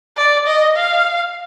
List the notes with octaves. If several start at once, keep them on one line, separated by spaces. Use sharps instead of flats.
D5
D#5
F5